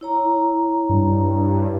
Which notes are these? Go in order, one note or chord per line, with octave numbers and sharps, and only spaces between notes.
E4 C#5 A#5
G2